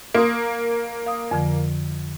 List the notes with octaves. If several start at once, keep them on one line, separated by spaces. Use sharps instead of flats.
A#3 A#5 C6 D#6
F5 D#6
F2 D3 F3